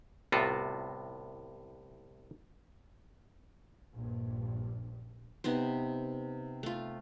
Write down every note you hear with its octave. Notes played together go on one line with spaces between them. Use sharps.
C2 A2 C3 B3 F4 F#4
A#1 G2
C3 B3 D#4 C5
A3 F4